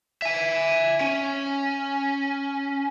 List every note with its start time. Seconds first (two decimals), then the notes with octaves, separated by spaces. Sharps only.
0.22 E5 G#5
1.01 C#4